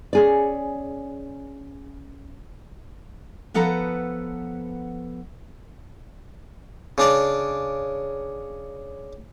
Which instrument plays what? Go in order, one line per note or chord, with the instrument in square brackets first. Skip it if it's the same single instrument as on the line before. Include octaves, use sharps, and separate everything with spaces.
[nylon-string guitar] C#4 G#4 D5
[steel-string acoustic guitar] F3 B3 A4 B4 F#5 A#5
[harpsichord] C#3 D4 D5